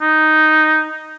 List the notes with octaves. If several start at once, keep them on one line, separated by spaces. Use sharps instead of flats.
D#4